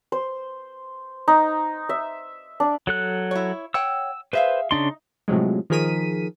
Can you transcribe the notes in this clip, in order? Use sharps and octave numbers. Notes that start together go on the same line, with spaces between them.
C5
D#4
E5
D4
F#3 A4 F#6
E4 C#5
C#5 F#5 G5 E6
G#4 B4 C5 E5 F5
C#3 D4 D#4 C6
A2 C3 F3 F#3 G#3
D#3 F3 G#4 A#4 B6 D#7